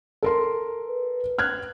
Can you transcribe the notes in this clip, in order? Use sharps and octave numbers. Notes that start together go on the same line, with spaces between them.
A4 A#4 C6
B4
F6 F#6 G#6